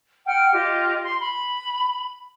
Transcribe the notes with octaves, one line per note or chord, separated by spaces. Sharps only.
F#5 G5 F6
F4 G4 D#5
C6
B5